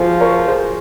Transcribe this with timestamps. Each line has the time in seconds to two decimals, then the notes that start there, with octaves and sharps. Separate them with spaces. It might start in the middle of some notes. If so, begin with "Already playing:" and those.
Already playing: F3 F#4 G#4 C5
0.21 A#4 C#5
0.48 G#4 C5